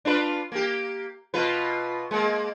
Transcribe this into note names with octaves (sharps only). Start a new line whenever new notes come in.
D4 F4 B4
A#3 G4
B2 F4 B4
G#3 A#3